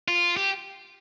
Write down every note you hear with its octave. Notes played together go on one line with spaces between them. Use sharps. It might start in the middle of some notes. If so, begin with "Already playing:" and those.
F4
G4